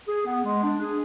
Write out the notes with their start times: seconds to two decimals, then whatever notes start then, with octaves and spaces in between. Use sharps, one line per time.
0.08 G#4
0.26 B3
0.45 G#3
0.63 D4
0.81 G#4